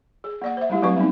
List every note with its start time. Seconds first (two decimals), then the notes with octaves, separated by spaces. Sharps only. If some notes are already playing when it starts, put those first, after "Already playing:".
0.24 G#4
0.42 A#3 D5 F#5
0.57 C5 E5
0.70 G3 A3 E4 G4
0.82 F#3 A3 C4 B4 C#6
0.96 G3 B3 C4 D#4